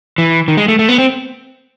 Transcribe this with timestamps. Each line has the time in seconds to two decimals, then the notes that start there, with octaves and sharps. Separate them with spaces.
0.18 E3
0.48 D#3
0.57 G#3
0.68 A3
0.79 A3
0.89 B3
0.98 C4